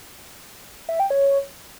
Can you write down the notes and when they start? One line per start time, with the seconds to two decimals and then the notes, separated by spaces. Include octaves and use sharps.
0.89 E5
1.00 G5
1.10 C#5